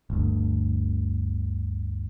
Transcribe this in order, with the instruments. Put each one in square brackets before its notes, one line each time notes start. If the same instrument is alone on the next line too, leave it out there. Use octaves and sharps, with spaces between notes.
[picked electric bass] G1 D2